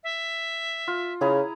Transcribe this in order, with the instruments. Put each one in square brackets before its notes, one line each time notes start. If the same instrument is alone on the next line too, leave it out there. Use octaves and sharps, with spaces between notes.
[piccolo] E5
[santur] F4
[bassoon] C#3 [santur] E4 G#4 A#5